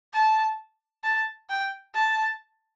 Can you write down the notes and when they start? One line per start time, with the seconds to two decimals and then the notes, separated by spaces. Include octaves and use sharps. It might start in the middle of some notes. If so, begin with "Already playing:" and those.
0.13 A5
1.04 A5
1.49 G5
1.95 A5